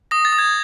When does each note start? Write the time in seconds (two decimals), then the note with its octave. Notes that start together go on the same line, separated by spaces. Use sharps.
0.11 D#6 A#6
0.25 A6
0.32 D#6
0.38 G#6